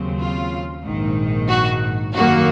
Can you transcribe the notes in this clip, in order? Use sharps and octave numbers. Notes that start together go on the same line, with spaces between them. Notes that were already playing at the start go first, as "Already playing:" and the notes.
Already playing: D#2 C#3 F#3 C4
F4
A#1 G#2 D#3
F#4
F#2 D#3 F#3 A#3 F#4